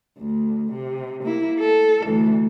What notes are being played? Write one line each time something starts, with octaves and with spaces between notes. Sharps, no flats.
D2
C3
A#3 E4
A4
D2 E3